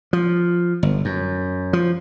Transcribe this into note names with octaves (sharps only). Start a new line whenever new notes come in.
F3
G1
F#2
F3